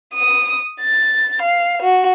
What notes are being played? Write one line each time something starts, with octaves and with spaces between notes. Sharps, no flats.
D#6
A6
F5
F#4